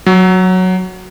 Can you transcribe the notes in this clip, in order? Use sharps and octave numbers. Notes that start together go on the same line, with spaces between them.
F#3